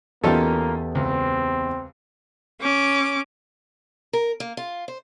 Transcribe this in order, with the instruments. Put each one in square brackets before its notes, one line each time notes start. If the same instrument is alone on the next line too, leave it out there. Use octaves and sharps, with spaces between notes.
[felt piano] E2 [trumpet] A#3 [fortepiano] C#4 D#4 F4 [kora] G4 A4
[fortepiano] C#2 [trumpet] C4
[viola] C#4 D6
[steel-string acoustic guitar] A#4
A#3
F4
C5